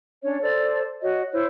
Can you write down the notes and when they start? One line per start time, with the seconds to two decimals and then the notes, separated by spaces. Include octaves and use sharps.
0.23 C#4 D4 C#5
0.41 A4 C5 D5
1.01 F#4 C#5 D#5
1.31 E4 C5 C#5